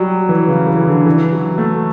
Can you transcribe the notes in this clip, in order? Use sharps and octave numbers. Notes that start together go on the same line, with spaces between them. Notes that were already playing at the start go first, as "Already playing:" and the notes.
Already playing: F#3 G3
E3
C#3
E3
D3
E3
F#3
A3